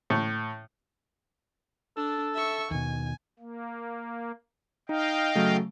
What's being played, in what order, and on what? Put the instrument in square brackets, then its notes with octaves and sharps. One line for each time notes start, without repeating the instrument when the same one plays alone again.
[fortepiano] A2
[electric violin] D4 [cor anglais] A4
[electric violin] E5 C#6
[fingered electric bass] D#2 B2 [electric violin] G#5
[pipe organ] A#3
[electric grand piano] D#4 [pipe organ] D#5 F5 G5
[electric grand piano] C#3 F#3 A3